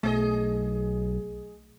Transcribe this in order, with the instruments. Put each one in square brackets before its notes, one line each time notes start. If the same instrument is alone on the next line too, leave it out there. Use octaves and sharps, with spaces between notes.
[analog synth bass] B1 [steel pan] A3 [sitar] G#4 C5 D#5